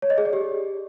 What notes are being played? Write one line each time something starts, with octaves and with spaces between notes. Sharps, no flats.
C#5
D#5
G#4
D5
G4